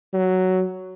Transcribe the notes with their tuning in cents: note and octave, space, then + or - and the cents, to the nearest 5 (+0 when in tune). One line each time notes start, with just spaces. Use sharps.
F#3 +5